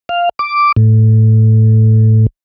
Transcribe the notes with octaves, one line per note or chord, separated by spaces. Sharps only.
F5
D6
A2